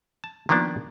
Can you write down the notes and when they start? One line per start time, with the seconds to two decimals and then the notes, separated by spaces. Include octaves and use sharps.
0.24 A5
0.49 D#3 F3 A#3 B3 D4